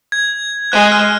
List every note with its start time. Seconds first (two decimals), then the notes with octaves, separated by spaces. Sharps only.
0.12 G#6
0.72 G#3 F#6
0.92 F6